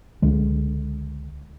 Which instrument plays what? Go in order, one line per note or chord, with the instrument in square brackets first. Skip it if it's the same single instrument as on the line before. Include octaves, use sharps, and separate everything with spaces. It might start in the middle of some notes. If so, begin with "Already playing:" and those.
[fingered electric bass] C#2 D3 G#3